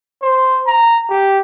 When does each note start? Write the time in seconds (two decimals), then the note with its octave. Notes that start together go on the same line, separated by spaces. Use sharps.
0.23 C5
0.67 A#5
1.10 G4